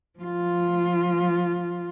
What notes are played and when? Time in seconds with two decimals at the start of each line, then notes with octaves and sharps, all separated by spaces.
0.19 F3 F4